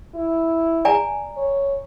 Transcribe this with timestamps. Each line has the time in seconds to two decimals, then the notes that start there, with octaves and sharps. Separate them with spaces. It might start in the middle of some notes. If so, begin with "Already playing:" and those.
0.15 E4
0.85 D5 G#5 A#5
1.37 C#5